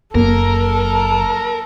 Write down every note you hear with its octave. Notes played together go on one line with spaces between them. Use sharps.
F#1 F#2 A#3 A4 A#4